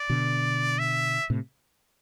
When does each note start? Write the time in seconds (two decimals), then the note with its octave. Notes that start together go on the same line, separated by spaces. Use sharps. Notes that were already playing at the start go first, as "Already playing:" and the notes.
Already playing: D5
0.10 B2 D3
0.79 E5
1.30 A2 C3